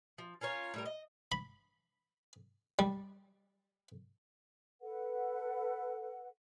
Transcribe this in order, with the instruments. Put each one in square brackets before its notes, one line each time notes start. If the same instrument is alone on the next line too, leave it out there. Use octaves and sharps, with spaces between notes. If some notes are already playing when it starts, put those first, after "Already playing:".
[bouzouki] F3
C#4 F4 A#4 C#5
A2 G3 A#4
D#5
[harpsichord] B5
G3
[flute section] A4 B4 F#5